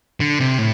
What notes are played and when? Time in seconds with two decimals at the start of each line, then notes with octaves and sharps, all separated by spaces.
0.20 D3
0.39 C3
0.58 A2